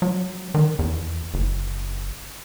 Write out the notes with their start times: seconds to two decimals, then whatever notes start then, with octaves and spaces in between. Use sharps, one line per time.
0.02 F#3
0.54 D#3
0.79 E2
1.34 F#1